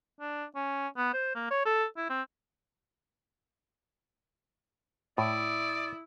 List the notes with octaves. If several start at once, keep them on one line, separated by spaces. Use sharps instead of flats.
D4
C#4
B3
C5
A#3
C#5
A4
E4
C4
A2 E4 D5 D#6